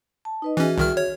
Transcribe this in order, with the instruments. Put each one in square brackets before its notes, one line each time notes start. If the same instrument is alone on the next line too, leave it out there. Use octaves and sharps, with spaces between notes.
[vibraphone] A5
D#4 B4 D#5
[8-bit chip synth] E3 C#4 [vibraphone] F#4 G#4 E5
[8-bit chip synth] C2 D#3 F6
C#5